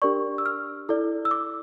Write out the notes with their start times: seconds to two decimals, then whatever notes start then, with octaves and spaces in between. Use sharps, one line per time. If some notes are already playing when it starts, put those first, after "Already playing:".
0.02 D4 G4 A#4 D5 C#6
0.38 E6
0.46 F6
0.89 E4 A4 D5
1.25 E6
1.31 D6